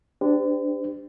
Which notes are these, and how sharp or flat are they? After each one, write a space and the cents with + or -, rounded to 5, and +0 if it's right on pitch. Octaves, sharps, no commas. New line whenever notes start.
D4 +0 G4 +10 C5 -45